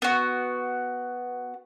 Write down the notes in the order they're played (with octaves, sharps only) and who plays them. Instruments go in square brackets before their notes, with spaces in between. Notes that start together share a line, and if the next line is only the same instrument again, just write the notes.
[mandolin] B3 F#4